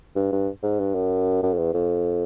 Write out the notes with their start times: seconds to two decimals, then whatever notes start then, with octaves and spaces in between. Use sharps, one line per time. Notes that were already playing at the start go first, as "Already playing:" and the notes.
0.16 G2
0.32 G2
0.63 G#2
0.79 G2
0.95 F#2
1.43 F#2
1.53 F2
1.58 E2
1.74 F2